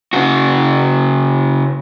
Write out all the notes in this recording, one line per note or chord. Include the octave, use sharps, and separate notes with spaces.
C#3 F#4